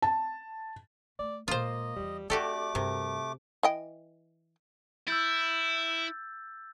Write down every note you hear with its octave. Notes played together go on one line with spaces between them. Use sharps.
A5
A3 D5
A#2 G#3 A#3 F4 C5 D#5
E2 E3 G3
A3 C4 D4 F#4 G4 A4 D5 D6
G2 C3 A#4
E3 D#5 G5
E4 E6 G6 A6